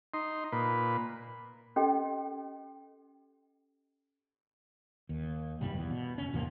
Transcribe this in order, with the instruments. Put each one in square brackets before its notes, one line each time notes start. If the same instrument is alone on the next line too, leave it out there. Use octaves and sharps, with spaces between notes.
[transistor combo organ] D#4 C6
A#2 B4
[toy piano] C#4 G4 A4 D#5 G5
[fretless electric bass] D#2
F1 B1 G2 G3
E2
B2
F1 C#4
G#1 E2 C3 A#3